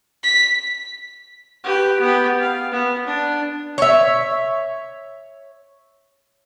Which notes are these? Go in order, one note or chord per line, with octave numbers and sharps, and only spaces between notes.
B6
G4 B4
B3 G4
F5
B3
D4
C#5 E5